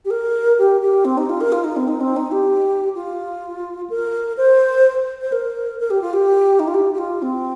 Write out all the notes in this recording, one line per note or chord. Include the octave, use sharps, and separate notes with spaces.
G4
A#4
G4
G4
C4
D#4
F4
A#4
F4
D#4
C4
D#4
C4
D#4
G4
F4
A#4
C5
C5
A#4
A#4
G4
F4
G4
D#4
F4
G4
G4
F4
C4